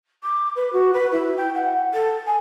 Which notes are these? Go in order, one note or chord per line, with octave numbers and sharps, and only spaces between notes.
D6
B4
F#4
B4
E4
G5
F#5
A4
G#5